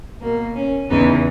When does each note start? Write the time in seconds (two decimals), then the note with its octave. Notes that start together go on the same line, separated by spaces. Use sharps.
0.21 B2 A#3
0.56 C#4
0.90 E2 C#3 E3 B3 D#4